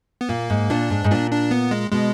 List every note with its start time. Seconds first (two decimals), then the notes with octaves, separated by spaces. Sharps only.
0.21 B3
0.29 A#2 A#3
0.50 G#2
0.70 A#2 D4
0.90 G#2
1.04 G#2
1.10 A#2 D4
1.31 D4
1.51 B3
1.71 G#3
1.92 B2 G#3